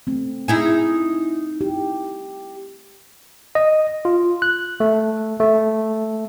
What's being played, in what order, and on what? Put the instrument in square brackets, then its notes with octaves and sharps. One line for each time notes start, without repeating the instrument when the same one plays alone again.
[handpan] A3 C4
[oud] D#4 E4 G#4
[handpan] G4
[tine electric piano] D#5
F4
F#6
A3
A3